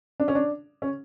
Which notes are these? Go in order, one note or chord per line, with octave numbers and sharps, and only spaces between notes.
D4
C#4
D4
C#4